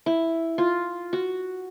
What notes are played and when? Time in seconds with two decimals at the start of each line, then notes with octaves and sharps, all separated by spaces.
0.06 E4
0.58 F4
1.13 F#4